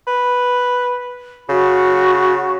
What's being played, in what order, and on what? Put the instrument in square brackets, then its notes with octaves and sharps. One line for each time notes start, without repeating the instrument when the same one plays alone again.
[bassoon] B4
[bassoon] C#3 [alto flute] F#4